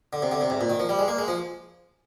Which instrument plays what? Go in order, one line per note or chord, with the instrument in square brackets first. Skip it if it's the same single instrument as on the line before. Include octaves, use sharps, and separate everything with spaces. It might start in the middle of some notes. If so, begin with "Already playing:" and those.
[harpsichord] D3
C3
D3
C3
G#2
A#2
D#3
F3
G3
G#3
A#3
G#3
F3